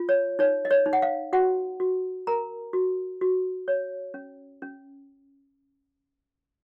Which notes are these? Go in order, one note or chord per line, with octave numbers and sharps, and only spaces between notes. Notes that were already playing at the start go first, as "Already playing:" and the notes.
Already playing: F4
C#5
D#4 C#5
D#5
C#5
D#4
F#5
F5
F#4 F#5
F#4
A#4 A#5
F#4
F#4
C#5
C#4
C#4